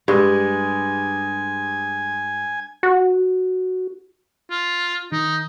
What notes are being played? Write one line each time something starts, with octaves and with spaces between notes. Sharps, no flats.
G2 G3 G#3 G#5
F#4
F4
D#3 D#4